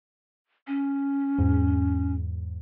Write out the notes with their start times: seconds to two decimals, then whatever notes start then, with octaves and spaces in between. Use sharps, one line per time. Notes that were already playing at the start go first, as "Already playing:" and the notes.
0.67 C#4
1.38 E2 G#2